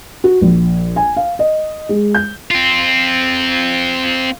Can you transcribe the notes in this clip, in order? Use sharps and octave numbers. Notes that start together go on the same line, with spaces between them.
F#4
A#1
G#5
F5
D#5
G#3
G6
C4 F4